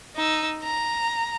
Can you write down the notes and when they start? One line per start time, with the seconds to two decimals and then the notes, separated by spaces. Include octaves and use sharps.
0.16 D#4 E6
0.63 A#5